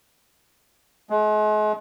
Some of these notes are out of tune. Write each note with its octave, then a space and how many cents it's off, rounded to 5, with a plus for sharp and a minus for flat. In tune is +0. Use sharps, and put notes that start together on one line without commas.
G#3 +40